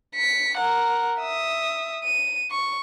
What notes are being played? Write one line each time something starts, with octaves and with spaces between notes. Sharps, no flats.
B6 C#7
A#4 F#5
E5 D#6
D#7
C#6